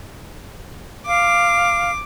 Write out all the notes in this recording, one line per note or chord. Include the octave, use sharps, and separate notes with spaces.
F5 D6